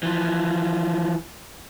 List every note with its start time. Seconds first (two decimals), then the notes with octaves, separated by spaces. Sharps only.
0.03 E3 F3